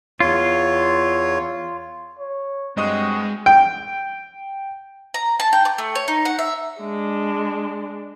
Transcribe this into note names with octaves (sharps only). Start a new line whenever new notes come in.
E2 F4 C#5
C#5
G2 G#3 C4 F#4 D#5 D#6
G5
A#5
A5
G5
D6
A3
C#5
D#4
F#5
E5
G#3 D4